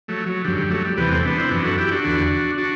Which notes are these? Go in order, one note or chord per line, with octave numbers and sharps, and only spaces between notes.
F#3 A3
F#3
F#2 D3 G3
G3
F#3 A3
G3
E2 C3 E3 G3 B3
A3 C4
B3 D4
C4 E4
F#2 E3 B3 D4
F#4 A4
E4 G4
D4 F#4
E2 D3
D4 F#4